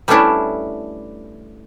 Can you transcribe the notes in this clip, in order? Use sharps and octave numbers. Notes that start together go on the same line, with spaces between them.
G3 A3 B3 C#4 D4 E4